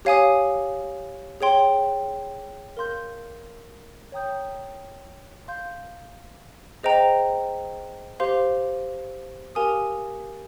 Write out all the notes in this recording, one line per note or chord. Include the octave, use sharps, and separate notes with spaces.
G4 C#5 F5 G#5 D#6
G#4 C#5 G5 C6
A#4 F5 C6 G6
C#5 G5 A#5 D#6 G6
F5 C6 G6
G#4 C5 D#5 G5 A#5
G4 C5 F5 C6
G4 A#4 F5 G#5 D#6